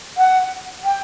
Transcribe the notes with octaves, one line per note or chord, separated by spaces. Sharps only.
F#5
G5